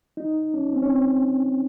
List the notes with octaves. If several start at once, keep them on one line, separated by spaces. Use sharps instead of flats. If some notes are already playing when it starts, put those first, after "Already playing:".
D#4
C#4
C4
C#4
C4